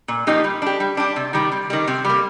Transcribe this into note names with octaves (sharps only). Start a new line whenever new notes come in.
A#2
F3 A#3 D#4 G4
G3
D4 G4
G3
D4 G4
C3
D#3 G3
C3
D#3 G3
C3
G3
A#3